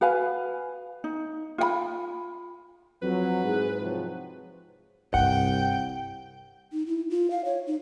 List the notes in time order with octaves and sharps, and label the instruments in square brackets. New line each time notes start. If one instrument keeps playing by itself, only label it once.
[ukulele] F#4 B4 F5 G#5
D#4
F4 F#5 B5
[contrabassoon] F2 [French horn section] F#3 [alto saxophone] B4
[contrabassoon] G#2 [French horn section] E4 G#4
[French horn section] C3 F3 F#3
[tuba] C2 [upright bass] G2 E4 [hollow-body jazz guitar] F#5 [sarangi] G5
[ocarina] D#4
E4
F4
F5
C#5
D#4